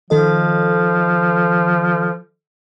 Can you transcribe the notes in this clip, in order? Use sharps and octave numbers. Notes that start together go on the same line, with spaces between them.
D#3 F3 A4 D#5